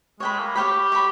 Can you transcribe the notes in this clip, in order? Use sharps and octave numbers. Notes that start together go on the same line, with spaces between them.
G#3 C#5 G5 B5
A#3
G4 C#5 G5 B5
C#5 G5 B5